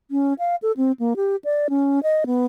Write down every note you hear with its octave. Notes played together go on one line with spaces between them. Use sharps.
C#4
F5
A4
C4
A#3
G4
D5
C#4
D#5
B3